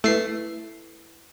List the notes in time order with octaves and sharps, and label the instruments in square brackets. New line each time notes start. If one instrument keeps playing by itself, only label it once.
[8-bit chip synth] A3 C7 [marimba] E4 B4